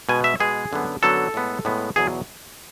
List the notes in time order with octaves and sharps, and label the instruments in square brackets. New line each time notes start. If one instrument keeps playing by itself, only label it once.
[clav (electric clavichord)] B2 G#3 B3 G#5
E5
B2 G#3 B3 G#4
F#2 D3 F#3 B3
F#2 D3 F#3 B3 A4
A2 G#3 B3
A2 G#3 B3
E2 B2 F#3 G#4